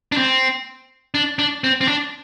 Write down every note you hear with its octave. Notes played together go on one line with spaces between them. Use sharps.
D4
C4
D4
D4
C4
C4
D4